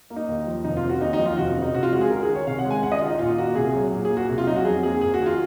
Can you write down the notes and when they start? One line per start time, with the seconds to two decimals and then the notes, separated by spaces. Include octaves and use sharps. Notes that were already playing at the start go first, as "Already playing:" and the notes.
0.10 A#3
0.16 D#4
0.28 D#2
0.47 F3
0.64 F1 D#4
0.77 F4
0.83 C#3
0.89 F#4
1.01 D#2 D#4
1.13 D#4
1.19 F3
1.25 F4
1.37 F1 F#4
1.56 C#3
1.62 D#4
1.74 C3 F#4
1.83 F4
1.93 G#3 F#4
2.01 G#4
2.10 C#2 A#4
2.23 G#4
2.28 D#3
2.35 C#5
2.47 C3 F5
2.59 F#5
2.65 G#3
2.71 G#5
2.83 C#2 F#5
2.92 D#5
3.01 D#3 F4
3.10 D#4
3.19 A#2 F4
3.38 A#3 F#4
3.55 C2 G#4
3.74 F#3
3.93 A#2
4.05 G#4
4.10 A#3
4.17 F#4
4.29 C2
4.38 F4
4.47 F#3 D#4
4.56 F#4
4.65 F2 G#4
4.83 A#3 G#4
5.01 F#1 G#4
5.14 F#4
5.20 D#3
5.26 F4